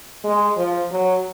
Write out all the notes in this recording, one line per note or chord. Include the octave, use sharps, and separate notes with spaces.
G#3
F3
F#3